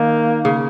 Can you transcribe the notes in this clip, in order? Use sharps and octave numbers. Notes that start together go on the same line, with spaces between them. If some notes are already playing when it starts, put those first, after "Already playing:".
Already playing: D#3 A#3
C#3 A#3